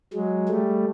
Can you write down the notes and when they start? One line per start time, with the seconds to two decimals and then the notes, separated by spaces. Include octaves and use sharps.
0.14 F#3 G#3
0.49 G3 A3